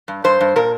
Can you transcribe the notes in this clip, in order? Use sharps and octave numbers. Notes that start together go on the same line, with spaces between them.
G2
G2 C5
G2
A#2 A#4